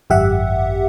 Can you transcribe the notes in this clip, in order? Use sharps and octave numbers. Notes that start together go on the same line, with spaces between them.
G#1 F#2 G4 E5 F#5